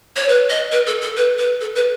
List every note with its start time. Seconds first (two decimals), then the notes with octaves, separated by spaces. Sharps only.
0.16 C#5
0.29 B4
0.50 D#5
0.72 B4
0.87 A4
1.01 A4
1.17 B4
1.38 B4
1.61 A4
1.76 B4